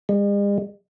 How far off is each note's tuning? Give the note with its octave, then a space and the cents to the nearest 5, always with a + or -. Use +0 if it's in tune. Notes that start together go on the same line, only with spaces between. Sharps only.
G#3 -45